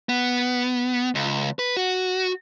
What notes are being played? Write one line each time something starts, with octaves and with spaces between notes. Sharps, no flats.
B3
C#2
B4
F#4